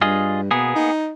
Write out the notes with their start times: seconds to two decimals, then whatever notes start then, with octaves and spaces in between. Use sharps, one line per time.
0.02 G2 F4 G#4 D#5
0.51 B2 A#3 B3 G#4
0.75 D#4